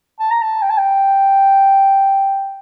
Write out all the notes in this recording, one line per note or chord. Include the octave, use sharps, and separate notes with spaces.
A5
A#5
A5
G5
A5
G5